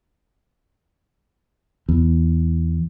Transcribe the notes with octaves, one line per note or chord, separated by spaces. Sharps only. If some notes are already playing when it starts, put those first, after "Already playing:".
E2